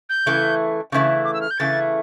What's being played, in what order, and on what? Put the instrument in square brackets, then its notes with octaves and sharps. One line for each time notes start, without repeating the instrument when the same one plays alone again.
[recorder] G6
[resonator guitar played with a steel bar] C#3 E3 A3 E4
C#3 E3 A3 E4
[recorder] D6
E6
F6
G6
[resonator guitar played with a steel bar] C#3 E3 A3 E4 [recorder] A6